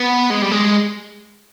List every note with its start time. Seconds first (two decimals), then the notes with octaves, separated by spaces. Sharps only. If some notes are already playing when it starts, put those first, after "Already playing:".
Already playing: B3
0.30 G#3
0.42 G3
0.51 G#3